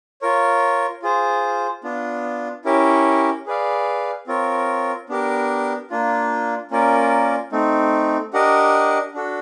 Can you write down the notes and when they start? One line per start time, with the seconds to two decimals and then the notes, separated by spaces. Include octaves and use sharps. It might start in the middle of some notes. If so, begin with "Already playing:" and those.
0.21 F4 A#4 C#5
1.02 F4 G#4 C5
1.84 B3 D4 F4
2.65 C#4 E4 G4 A#4 C#5
3.46 G#4 B4 D5 F5
4.27 C4 F4 A#4 C#5
5.09 B3 D4 G4 A#4
5.90 A#3 D4 F4
6.71 A#3 C#4 F4 A#4 D5
7.52 A3 C4 D#4
8.33 D4 G4 A#4 D#5 F#5
9.14 D4 F#4 A4